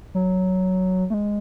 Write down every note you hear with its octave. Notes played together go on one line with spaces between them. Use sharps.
F#3
A3
G#3